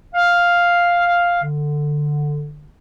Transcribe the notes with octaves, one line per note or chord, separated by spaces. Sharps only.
F5
D3